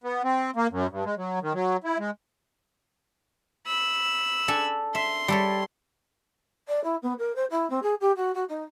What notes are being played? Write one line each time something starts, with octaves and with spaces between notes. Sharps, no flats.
B3
C4
A#3
F#2
G2
G#3
F#3
D#3
F#3
E4
G#3
B5 E6
D4 A4 G#5
E5 C6
G3 A4 C#5
D5
E4
B3
A#4
C5
E4
C4
G#4
G4
F#4
F#4
D#4